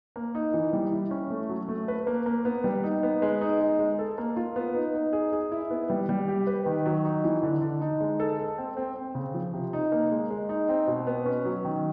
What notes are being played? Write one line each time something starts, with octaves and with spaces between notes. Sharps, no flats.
A#3
D#4
E3
G3
E4
C#4
A3
F#3
A3
B4
A#3
A#3
B3
G3
D#4
B3
G#3
D#4
G#3
G#3
A4
A#3
F4
B3
D#4
D#4
G#4
G#4
E4
B3
G3
G3
G4
B4
D#3
F#3
D#4
E3
D3
D3
D#4
G#3
A4
A4
C4
C4
C4
C#3
F3
C3
D#4
A#3
G#3
G#3
D#4
C4
B2
B3
C#4
F#3
D#3